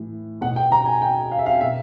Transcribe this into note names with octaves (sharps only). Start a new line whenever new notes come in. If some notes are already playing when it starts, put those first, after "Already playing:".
Already playing: A2 E3
B2 F#5
G5
A#5
G#5
G5
F5
E5
F5
B2 E5